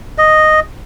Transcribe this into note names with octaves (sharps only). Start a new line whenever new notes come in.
D#5